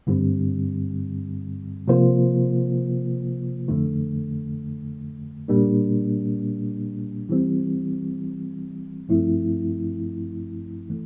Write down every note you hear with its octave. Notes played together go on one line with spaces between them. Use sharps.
G2 D3 G3 C4
C3 F3 A#3 F4 C5
F2 D3 A3
A#2 G3 A#3 D4
E3 G3 C4
G2 F3 A3 C4 E4
E3 A3